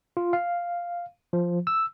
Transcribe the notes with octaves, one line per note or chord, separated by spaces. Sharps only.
F4
F5
F3
E6